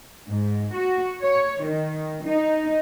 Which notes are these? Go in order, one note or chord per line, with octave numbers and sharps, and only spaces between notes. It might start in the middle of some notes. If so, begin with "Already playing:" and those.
G#2
F#4
C#5
D#3
D#4